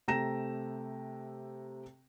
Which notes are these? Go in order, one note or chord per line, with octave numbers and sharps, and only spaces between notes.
C3 A3 G5 A#5 A#6 E7